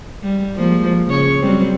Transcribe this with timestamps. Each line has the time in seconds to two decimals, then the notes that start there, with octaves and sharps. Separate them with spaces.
0.23 G3
0.56 F3 G#3 A#3
1.07 C#3 C#5
1.40 F#3 G3 C4